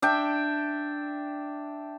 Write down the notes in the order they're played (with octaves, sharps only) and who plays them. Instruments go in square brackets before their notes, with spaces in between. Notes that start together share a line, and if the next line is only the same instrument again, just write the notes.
[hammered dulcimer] D4 E5 G5